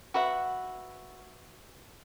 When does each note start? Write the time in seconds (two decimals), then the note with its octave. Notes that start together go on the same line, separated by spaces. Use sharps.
0.14 F#4 B4 E5 F#5